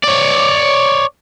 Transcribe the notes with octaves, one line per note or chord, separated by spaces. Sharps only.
C#5 D5